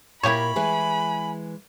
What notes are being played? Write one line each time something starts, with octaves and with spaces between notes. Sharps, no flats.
A#2 E4 G4 A#4 C#5 B5
E3 G#3 B4 G#5